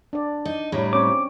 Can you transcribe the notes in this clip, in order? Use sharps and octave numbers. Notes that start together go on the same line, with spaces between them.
D4 D5
D#4
A2 F#3 G3
C4 C#4 C#5 D6